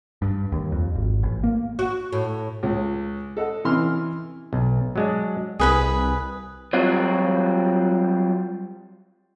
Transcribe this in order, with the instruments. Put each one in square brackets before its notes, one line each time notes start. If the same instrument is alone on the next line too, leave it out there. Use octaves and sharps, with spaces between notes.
[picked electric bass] G2
D#2
F2
G#1
A1
A#3
[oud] F#4
A2
[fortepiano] C#2
A4 D#5 F#5
C3 E3 C#4 C6 F6
[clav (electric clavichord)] B1
F#3 G#3 D4
[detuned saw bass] C2 [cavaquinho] G#4 B4 B5
[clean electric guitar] F#3 G3 C4 F4 F#4